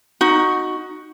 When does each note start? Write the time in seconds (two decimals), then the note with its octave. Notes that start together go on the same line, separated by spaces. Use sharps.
0.21 D#4 F#4